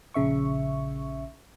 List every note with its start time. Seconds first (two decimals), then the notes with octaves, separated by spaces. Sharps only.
0.14 A#1 C#3 E5 C#6